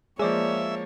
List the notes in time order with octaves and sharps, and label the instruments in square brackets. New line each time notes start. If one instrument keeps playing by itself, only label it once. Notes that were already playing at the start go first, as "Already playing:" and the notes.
[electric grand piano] F3 G#3 [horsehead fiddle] A#3 C#5 [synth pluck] G#4 D5 [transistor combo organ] E5